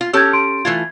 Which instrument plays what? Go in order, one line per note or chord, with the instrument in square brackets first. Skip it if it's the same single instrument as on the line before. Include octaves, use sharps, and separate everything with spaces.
[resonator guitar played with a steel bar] F4
[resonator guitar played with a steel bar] C#4 G4 A4 [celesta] E6 G6 G#6
[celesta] C6 D7
[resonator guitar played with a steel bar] E3 A3 F4 [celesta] G#6